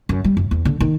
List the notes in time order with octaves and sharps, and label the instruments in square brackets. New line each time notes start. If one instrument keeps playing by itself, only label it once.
[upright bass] F#2
G3
F#2
E2
D3
D#3